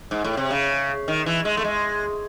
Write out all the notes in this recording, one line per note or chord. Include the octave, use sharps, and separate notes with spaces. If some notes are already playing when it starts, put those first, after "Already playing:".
G#2
A2
C3
C#3
D#3
E3
G#3
A3
G#3